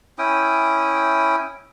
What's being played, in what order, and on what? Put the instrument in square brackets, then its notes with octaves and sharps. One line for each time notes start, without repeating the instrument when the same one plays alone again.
[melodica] C#4 E4 G5 D#6